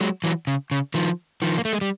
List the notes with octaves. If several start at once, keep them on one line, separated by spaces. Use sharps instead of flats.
F#3 G#3
E3 F#3
C#3
C#3
D#3 F3
D#3 F3
A#3
A3
G#3
G3